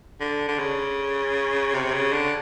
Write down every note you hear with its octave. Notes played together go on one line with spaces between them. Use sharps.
D3
D3
C#3
C3
C#3
D3